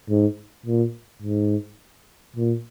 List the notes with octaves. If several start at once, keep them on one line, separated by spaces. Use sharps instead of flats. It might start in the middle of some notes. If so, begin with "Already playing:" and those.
G#2
A#2
G#2
A#2